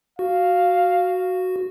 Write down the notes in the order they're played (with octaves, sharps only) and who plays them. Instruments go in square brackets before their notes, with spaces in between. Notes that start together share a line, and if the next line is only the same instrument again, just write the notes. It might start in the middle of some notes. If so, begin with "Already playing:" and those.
[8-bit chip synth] F#4 [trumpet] F5